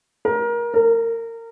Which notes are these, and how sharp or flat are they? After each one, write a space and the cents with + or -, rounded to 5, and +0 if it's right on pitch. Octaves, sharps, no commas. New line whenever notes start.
A#4 +25
A#4 -25